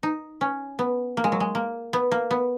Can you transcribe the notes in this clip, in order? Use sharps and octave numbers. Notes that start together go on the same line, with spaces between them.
D#4
C#4
B3
A#3
G#3
F#3
G#3
A#3
B3
A#3
B3